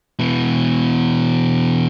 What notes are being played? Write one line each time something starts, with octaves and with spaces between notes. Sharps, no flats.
B2 E3